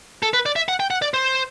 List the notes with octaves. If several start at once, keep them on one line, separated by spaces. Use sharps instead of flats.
A4
B4
D5
E5
F#5
G5
F#5
D5
C5